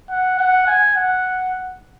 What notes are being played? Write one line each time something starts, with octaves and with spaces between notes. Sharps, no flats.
F#5
F#5
G#5
F#5